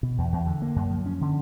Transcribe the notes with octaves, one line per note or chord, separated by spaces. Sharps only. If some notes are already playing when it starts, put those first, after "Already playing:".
B2
E2
E2
D3
A#3
F#2
F3
C#4
D3